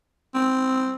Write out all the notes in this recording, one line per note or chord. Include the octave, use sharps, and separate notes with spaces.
C4